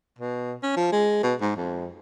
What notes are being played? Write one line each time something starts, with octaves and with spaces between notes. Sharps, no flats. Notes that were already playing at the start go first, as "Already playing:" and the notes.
B2
C#4
F3
G#3
B2
G#2
F2